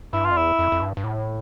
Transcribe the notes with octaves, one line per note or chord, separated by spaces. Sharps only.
G2 E4
F4
F2
E2 E4
F2
F2
G2
G2
A2